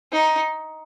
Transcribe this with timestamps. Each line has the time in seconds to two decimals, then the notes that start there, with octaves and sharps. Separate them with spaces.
0.12 D#4